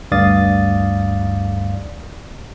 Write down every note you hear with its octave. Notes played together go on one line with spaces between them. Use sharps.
D2 G2 D5 F5 D#6 A6